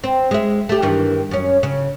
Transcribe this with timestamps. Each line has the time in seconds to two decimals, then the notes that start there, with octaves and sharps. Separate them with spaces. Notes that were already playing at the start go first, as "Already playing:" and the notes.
0.04 C4
0.31 G#3 E5
0.69 A3 G4
0.82 G2 D#3 E3
1.31 F#2 C#4
1.63 C#3